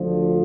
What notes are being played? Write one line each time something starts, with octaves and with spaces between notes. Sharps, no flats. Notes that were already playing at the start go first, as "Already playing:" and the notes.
Already playing: D2 D3 F3